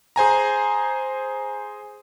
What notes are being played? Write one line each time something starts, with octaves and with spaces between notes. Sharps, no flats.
G#4 C5 G#5 A#5